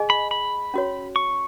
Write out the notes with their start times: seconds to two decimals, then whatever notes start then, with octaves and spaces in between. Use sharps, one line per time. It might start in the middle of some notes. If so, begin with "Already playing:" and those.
Already playing: G#4 D#5 G#5
0.10 B5
0.31 B5
0.74 C#4 F#4 C#5
1.16 C#6